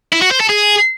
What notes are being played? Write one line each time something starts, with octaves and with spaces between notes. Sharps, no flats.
E4
F#4
C5
A4
G#4